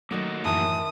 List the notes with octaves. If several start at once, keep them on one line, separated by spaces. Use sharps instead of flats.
D#3 F#3 A3 A#3 D#4 F#4
F#2 A2 D#3 E3 E5 A5 D#6